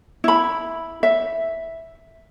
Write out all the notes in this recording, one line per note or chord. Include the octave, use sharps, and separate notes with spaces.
E4 B5
E5